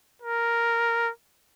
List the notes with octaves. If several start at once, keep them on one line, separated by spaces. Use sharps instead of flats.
A#4